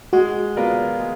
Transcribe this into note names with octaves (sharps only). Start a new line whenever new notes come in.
G#3 F#4
B3 F4 A#4 D5
G#3